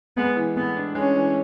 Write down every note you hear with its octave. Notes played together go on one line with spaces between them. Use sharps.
G#3 B3
E3
A2 B3
D4
G#3 C#4
E3